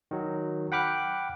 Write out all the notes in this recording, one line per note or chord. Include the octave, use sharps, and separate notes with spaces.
D#3 F#3
F#5 G5 B5 D6 F6 F#6